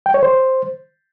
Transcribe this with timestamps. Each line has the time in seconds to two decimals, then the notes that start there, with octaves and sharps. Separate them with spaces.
0.06 G5
0.14 C#5
0.23 C5